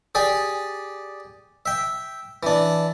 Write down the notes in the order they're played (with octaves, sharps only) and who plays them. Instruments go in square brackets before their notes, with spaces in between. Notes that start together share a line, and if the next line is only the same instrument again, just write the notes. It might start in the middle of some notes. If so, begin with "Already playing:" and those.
[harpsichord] G4 G#4 D5 G#5
E5 G5
E3 D4